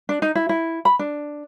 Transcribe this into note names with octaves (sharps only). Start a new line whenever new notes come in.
D4
D#4
E4
E4
B5
D4